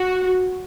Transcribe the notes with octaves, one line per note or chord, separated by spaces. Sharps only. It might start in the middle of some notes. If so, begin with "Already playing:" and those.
Already playing: F#4